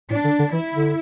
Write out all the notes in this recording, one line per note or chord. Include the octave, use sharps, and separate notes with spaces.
A2 D4
D3
D3
E3 E4
D3